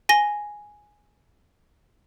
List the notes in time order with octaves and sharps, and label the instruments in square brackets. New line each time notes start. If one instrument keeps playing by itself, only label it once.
[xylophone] G#5 A#6 G7